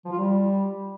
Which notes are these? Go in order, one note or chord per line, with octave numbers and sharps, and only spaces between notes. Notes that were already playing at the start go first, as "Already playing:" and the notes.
F3
F4
G3